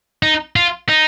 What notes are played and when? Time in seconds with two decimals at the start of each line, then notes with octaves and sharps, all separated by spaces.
0.23 D#4
0.56 F4
0.89 D#4